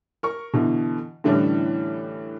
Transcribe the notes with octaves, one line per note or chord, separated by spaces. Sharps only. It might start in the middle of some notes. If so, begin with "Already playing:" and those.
A#4 C#6
B2 D3 E3
A2 D3 E3 G3 C#4 D4